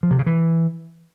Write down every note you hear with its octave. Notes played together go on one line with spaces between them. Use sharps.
F3
C3
C#3
E3